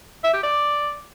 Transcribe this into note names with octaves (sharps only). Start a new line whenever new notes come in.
E5
G4
D5